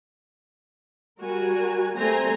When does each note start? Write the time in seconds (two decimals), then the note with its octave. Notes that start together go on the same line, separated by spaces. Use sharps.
1.21 G3 F#4 A#4 G#5
1.97 G3 A3 C4 C5 G#5 A#5